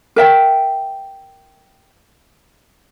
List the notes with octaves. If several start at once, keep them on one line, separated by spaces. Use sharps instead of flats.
A#4 E5 G5